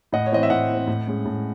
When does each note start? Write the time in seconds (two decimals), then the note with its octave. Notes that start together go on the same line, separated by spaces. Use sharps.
0.12 A2 D#5 F#5
0.26 C#5
0.32 E3 C4 D#5
0.43 E5
0.50 A2 D#5 F#5
0.69 E3
0.74 C4
0.87 A2
1.07 G#3 C#4
1.25 A2